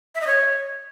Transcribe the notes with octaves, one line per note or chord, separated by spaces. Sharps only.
E5
D#5
C#5